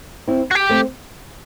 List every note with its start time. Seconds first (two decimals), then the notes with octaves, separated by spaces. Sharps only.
0.28 C4 E4
0.51 F#4
0.55 G4
0.69 A3 C4